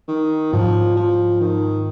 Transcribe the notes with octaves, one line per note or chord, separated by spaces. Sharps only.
D#3
G#2 F3 F#3 C4
F3
D#3